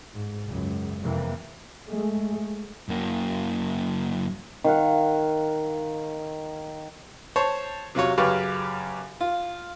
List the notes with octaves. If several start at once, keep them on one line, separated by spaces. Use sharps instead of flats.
G#2
C#2 F#2
F2 C3 E3 A#3
G#3 A3
F#2 A#3
D#3 F5 F#5
C5 C#5 A5
C3 F#3 F4 C#5
F#2 C#3 G4 B4 C#5 F5
F4